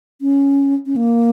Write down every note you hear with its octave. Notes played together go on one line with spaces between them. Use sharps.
C#4
C#4
A#3